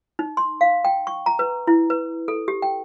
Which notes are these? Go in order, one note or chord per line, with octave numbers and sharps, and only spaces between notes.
D#4
C6
F5
G5
C#6
A#5
B4
E4
B4
A4
G4
G5